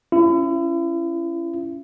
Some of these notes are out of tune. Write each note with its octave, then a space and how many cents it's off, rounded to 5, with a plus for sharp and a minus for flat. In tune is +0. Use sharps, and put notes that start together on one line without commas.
C#4 +0 E4 +40